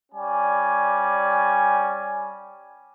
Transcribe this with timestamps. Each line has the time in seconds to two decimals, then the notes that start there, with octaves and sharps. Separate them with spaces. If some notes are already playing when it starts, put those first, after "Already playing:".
0.12 G3 C#4 D5 G#5